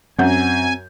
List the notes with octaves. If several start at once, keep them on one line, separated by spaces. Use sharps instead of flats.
F#2 C4 F#4 G#5 G6